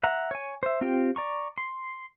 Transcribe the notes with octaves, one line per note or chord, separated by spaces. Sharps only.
E5 F#5 A#5
C#5 G#5
C5 E5
C4 F4 G4 G5
D5 A#5 C#6
C6